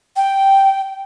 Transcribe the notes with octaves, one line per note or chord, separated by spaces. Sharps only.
G5